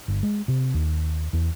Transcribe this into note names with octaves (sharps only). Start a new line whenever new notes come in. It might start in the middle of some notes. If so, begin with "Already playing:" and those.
G1
G#3
C3
D#2
E2